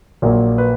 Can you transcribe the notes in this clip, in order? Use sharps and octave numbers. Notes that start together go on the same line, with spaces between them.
A#1 A#2 F#3 A#3
B4